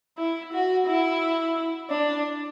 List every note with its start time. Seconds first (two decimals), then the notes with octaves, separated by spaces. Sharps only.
0.18 E4
0.53 F#4
0.87 E4
1.90 D4